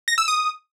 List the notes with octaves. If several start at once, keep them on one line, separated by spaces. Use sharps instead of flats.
A#6
E6
D#6